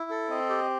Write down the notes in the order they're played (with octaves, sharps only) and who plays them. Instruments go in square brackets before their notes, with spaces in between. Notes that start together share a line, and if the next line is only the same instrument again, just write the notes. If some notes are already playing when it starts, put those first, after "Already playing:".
Already playing: [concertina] E4
A4
[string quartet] C4 [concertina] D#5
[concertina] G4